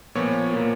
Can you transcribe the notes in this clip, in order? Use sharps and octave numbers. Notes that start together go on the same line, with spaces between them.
A#2 F3 B3 C#5
A#2 F3 A#3